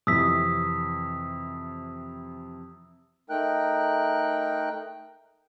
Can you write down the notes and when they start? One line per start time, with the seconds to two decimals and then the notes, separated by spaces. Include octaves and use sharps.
0.07 F2 C3 E3 D#6 E6 B6
3.30 A3 D#4 A#4 G5 F#6